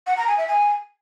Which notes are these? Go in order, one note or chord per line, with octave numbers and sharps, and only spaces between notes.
F#5
A#5
G#5
E5
G#5